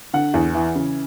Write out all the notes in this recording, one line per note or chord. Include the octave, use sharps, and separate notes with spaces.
D3 F#5
E2
E3
C#3